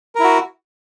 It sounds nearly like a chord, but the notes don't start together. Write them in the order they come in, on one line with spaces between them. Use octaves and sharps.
A#4 E4 F#4